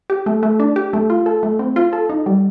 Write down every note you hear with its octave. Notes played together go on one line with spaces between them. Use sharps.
G4
A3
A3
D4
G4
A3
F4
A4
A3
C4
F4
A4
D#4
G3